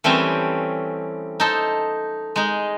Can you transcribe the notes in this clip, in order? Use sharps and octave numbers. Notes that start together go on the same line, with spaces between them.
E3 G3 A3 C4 C#4
D#4 A4 C5
G#3 D#4